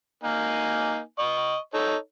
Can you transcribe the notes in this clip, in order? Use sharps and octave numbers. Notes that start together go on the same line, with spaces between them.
A#3 D#4 G#5
D#5 C#6
D#4 A4 C#5